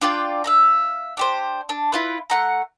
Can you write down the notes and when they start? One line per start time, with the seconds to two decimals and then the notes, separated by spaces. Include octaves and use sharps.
0.02 D4 F4 D5 G5
0.44 E5 F5 A#5
1.17 D4 G4 C5
1.69 D4
1.92 E4 F4 B4
2.30 A3 F#5 A#5